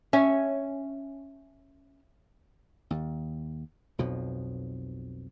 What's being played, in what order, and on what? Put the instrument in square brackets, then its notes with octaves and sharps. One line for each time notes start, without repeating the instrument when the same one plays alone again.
[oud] C#4 [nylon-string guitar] E5
[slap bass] D#2
B1 F2 B2 F3